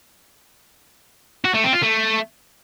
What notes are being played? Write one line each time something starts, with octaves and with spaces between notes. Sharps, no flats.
F#4
A3
C4
F4
A3